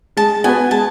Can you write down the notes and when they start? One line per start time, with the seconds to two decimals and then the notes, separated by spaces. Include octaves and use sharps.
0.17 G#3 A5
0.44 B3 F#4 B4 G#5
0.71 G#3 A5